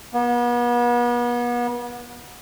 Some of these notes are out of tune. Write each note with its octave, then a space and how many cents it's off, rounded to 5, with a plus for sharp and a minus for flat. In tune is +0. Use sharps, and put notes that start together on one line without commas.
B3 -40